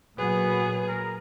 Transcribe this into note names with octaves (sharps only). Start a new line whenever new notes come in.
A#2 F#3 B3 G#4 B4
A#4